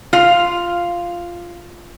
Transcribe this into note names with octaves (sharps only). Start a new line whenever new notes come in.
F4 F5